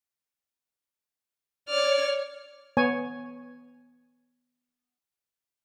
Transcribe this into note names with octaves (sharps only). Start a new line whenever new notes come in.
C#5 D5 F6
B3 C#5 G#5